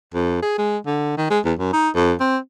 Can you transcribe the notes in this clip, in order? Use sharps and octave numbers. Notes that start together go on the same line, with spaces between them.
F2
G#4
G#3
D3
D#3
G#3
E2
F#2
D#4
F2
C4